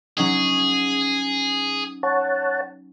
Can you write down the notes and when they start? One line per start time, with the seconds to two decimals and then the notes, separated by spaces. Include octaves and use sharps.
0.17 F#3 C#4 D#4 G#4
2.03 C#5 F#5 A5